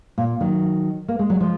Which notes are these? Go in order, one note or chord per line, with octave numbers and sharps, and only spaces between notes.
A#2
D#3 F#3
A#3
G#3
F#3
F3 G#3